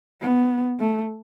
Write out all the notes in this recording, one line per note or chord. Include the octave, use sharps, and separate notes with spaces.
B3
A3